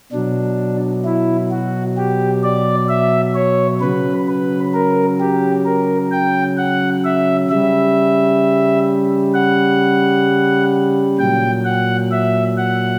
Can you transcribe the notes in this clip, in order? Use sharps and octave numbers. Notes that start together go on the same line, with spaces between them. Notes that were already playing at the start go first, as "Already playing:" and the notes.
B2 F#3 D4
E4
F#4
G4
D5
E5
C#5
C#3 F#3 B4
B4
A#4
G4
A#4
G5
F#5
E5
C#3 G3 E5
F#5
A#2 F#3 G5
F#5
E5
F#5